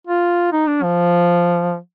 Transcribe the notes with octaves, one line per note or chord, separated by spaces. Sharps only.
F4
D#4
D4
F3